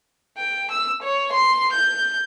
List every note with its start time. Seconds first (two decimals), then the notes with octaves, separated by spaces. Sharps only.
0.37 G5
0.72 E6
1.03 C#5
1.33 C6
1.73 G6